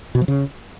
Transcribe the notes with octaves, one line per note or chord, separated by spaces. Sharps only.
B2
F3
C#3